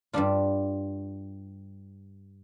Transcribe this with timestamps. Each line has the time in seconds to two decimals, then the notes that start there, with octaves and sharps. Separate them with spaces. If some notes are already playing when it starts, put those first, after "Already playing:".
0.13 G2 G3 D4 F4